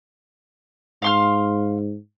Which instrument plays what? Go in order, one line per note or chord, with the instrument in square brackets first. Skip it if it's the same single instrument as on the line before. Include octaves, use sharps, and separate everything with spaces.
[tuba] G#2 [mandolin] F5 C6 F6